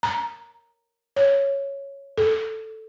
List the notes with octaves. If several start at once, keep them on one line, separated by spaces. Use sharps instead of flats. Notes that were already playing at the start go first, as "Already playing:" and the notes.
A#5
C#5
A4